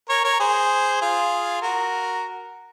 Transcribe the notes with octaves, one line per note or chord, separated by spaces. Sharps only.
A#4 C#5
A#4 C#5
G#4 C5
F4 G#4
F#4 A#4